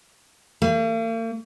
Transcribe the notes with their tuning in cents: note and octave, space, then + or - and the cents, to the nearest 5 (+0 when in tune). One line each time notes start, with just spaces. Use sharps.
A#3 -45